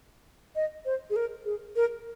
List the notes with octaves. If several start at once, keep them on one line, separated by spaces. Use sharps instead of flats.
D#5
C5
G#4
A#4
G#4
A#4